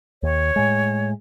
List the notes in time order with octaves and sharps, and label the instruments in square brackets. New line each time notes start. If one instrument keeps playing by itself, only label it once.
[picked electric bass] D#2 [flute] C#5
[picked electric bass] A2 G#3